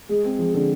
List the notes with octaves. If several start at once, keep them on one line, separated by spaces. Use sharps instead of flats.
G#3 G#4
C4
F3
D3